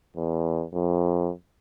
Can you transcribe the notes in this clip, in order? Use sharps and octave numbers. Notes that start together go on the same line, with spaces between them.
E2
F2